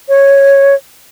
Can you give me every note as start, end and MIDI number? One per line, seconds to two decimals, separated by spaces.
0.09 0.75 73